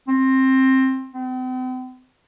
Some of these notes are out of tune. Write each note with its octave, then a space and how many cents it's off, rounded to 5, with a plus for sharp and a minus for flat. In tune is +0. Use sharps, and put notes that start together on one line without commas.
C4 +15
C4 -45